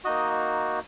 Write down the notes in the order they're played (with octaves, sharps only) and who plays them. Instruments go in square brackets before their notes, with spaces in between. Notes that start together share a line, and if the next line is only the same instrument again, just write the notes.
[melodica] A#3 D#4 F#4 D#5